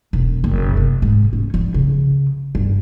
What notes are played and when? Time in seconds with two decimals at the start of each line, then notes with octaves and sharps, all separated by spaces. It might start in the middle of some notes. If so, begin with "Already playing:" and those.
0.13 E1
0.44 F#1
0.77 C3
1.02 G#2
1.33 C#4
1.54 F3
1.74 C#3
2.55 G2